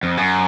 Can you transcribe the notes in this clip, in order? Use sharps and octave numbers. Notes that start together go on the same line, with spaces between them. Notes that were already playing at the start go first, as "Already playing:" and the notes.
F2
F#2